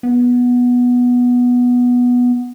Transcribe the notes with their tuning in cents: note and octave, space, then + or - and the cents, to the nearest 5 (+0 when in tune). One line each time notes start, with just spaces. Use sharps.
B3 -10